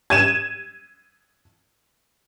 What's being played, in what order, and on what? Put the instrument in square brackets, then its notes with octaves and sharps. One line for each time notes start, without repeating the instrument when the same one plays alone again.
[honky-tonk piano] G#6 D#7 E7